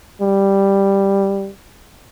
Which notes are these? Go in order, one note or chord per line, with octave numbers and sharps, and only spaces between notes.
G3